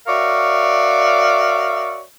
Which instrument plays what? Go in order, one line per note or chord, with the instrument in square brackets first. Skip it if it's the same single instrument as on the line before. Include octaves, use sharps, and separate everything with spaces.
[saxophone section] F#4 A#4 C#5 D5 E5 F5